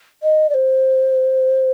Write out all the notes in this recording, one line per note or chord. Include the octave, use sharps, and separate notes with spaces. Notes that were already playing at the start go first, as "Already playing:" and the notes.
D#5
D5
C5